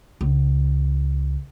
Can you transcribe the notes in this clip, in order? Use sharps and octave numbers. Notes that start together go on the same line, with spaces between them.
C#2